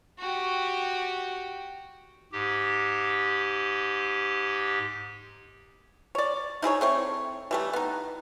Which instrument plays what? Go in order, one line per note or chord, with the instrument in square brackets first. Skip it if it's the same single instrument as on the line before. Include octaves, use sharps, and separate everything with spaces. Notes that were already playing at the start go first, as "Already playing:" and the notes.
[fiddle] F#4 G4
[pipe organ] G#2 G4
[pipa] C#5 D5
D#4 E4 G#4 C#5
A3 C4 C#5
E3 G3 A3
B3 D#4